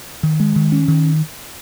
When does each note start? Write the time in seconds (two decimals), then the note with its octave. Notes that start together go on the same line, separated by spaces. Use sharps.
0.23 D#3
0.40 G#3
0.56 D#3
0.72 C#4
0.88 D#3